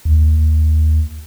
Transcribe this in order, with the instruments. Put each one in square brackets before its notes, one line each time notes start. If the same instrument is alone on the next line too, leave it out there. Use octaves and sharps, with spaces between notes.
[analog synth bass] D#2